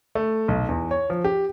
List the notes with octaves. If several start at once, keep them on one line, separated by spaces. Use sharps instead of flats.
A3
B1
E2
C#5
F3
G4